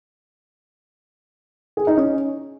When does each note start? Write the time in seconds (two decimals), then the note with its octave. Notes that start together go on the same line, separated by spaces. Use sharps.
1.77 G#4
1.87 D#4
1.97 C#4